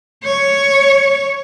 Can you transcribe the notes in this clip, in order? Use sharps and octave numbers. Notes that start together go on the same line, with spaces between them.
C#5